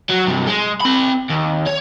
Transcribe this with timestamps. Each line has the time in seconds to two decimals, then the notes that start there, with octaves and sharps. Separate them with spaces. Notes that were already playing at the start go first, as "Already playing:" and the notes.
0.09 F#3
0.27 G2 C3
0.47 G#3
0.81 C4 B5
1.29 D#2
1.66 C#5